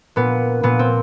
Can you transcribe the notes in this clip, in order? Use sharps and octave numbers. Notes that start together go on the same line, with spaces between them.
A#2 B3
A#2 B3
C4